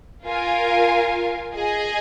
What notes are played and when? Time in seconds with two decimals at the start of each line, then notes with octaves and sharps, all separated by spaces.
0.25 F4 A#4 F5 G#5
1.54 G#4 D#5 G#5